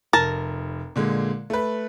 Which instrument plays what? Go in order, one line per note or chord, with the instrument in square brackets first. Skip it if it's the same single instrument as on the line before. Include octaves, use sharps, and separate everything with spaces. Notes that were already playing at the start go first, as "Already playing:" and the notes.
[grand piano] F1 [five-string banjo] A#4 A5
[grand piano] A#2 D3 G#3
A3 B4